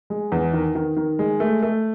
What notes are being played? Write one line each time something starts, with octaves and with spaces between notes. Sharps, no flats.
G#3
E2
D#3
D#3
D#3
G#3
A3
A3